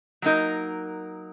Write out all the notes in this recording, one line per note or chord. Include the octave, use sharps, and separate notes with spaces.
F#3 A#3 D#4 A#4